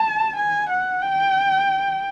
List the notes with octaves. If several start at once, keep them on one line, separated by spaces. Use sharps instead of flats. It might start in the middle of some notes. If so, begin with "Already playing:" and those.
Already playing: A5
G#5
F#5
G5